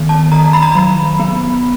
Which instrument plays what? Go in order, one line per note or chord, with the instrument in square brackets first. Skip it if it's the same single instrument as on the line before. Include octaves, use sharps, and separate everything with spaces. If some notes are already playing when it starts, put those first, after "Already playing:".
Already playing: [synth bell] D#3 B3
A5
D#3 A#5
B5
A#5
F#3 B5
B3